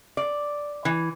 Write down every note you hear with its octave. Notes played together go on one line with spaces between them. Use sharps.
D5
E3